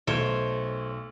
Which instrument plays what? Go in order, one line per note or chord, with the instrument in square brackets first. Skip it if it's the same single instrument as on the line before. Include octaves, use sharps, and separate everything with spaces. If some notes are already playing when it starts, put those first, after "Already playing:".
[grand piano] B1 A3 D7 [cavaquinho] C5 C#5